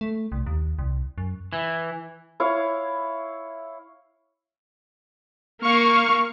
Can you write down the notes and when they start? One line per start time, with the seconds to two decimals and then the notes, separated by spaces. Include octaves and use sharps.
0.01 A3
0.32 C2
0.46 D#2
0.79 C2
1.18 F#2
1.53 E3
2.40 E4 C#5 F5
5.62 A#3 F5 C#6